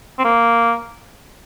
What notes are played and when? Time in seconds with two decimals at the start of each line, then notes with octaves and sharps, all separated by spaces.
0.18 C4
0.24 A#3